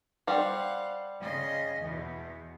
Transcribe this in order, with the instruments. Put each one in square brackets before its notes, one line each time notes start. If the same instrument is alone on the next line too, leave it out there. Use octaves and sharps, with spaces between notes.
[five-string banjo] G3 C5 [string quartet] F5 F#5
[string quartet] C#3 D#5 C6
E2 B2